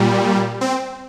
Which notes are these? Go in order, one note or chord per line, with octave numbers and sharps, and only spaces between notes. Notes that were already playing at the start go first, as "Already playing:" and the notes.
Already playing: A#2 G3
C4